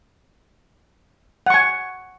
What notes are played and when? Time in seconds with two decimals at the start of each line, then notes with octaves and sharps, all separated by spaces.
1.46 F#5
1.50 C#6
1.54 G#5